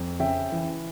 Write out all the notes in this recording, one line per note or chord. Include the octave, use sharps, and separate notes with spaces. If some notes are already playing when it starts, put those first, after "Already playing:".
Already playing: F2
C#3 E5 G5
E3